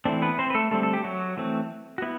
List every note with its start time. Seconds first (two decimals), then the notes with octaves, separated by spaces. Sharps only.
0.05 E3 A3 C4 D4
0.22 B3 B4
0.39 C4 C5
0.50 B4
0.54 A3 A4
0.71 D3 G3 A3 C4 A4
0.83 A4
0.93 G4
1.04 F#3 F#4
1.37 E3 A3 C4
1.98 F#4
2.02 B3 E4